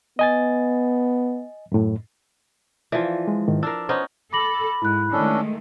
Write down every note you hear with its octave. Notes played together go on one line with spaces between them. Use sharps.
B3 D#5 G#5 A6
F#2 A2
E3 F3 F4 D5
G#3
G#2 D#3
D4 A#4 E6
B3 C#4 D#4 C5
A4 B5 D6 A#6 F#7
G#2 E4 F#6
D#3 G#3 A3 C#4 D4 A4